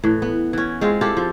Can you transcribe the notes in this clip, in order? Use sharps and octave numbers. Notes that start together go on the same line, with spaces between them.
A2 E3
B3
E3 C#4
G#3 C4 F4
E4 F4 G4 A4
F3